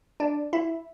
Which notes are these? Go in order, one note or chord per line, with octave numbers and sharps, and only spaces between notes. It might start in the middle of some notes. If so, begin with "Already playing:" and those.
D4 D5
E4 E5